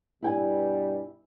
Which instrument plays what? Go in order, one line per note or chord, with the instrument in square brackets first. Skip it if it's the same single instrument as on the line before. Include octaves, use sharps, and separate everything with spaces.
[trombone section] G2 B2 G3 [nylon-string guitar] E4 G5 G#5